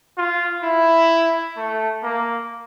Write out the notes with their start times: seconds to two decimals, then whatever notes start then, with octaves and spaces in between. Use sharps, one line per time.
0.18 F4
0.63 E4
1.57 A3
2.03 A#3